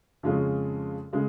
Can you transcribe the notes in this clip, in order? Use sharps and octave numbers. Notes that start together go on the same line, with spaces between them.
F2 C#3 G#3 C#4 F4
C#3 G#3